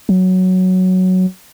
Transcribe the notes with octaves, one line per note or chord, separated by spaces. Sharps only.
F#3